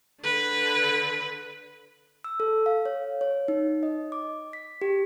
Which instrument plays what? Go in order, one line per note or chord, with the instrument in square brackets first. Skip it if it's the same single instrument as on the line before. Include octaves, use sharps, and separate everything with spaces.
[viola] D3 B4
[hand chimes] E6
A4
F5
C#5
C#5
D#4
D#5
D6
B6
G4